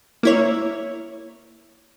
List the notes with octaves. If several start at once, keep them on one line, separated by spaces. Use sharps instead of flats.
A#3 E4 C#5